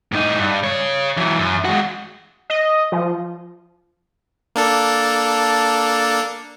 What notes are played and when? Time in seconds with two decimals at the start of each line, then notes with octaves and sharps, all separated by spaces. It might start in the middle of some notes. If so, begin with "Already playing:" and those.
0.12 A2 D#4
0.38 G2
0.64 C#3 C#5
1.17 E3 F#3
1.39 F#2
1.65 G#3 F#4
2.50 D#5
2.92 F3
4.55 A#3 D4 A4